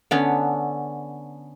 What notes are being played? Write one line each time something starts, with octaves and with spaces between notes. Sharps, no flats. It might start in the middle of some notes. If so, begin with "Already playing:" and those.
D3 B3 C#4